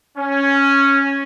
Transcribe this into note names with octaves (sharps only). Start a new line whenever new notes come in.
C#4